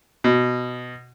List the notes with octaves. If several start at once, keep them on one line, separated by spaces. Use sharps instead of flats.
B2